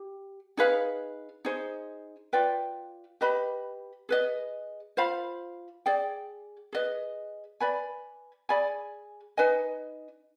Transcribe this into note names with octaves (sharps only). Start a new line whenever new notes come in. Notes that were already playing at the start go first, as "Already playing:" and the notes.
Already playing: G4
D#4 G#4 B4 F5
D#4 G#4 C5
F4 B4 D5 G5
G4 B4 D#5 B5
G#4 B4 D#5
F4 C5 F5 B5
G#4 D5 G5
G#4 B4 D#5
B4 D5 G#5 B5
G#4 D5 G#5 B5
D#4 B4 D#5 G#5